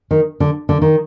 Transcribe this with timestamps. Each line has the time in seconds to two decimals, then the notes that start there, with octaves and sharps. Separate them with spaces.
0.11 D#3
0.40 D3
0.69 D3
0.82 D#3